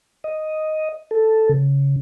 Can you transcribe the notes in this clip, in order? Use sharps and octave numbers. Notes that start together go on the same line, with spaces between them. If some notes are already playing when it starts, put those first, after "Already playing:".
D#5
A4
C#3